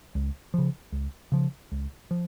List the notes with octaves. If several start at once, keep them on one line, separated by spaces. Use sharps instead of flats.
C#2
C#3 F3
C#2
C#3 F3
C#2
F3